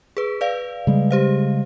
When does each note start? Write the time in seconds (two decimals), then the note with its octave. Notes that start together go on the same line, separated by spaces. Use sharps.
0.17 G#4 B4
0.41 B4 D5 F5
0.87 C#3 G3 G#3
1.11 G4 C5 F5